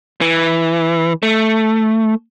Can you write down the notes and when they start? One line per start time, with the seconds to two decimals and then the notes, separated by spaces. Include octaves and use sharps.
0.21 E3
1.23 A3